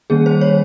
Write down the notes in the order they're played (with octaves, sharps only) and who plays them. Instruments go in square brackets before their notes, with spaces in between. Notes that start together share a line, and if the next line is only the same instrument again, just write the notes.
[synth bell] D#3 G3 A#3 C#4 G#4
C5
C#5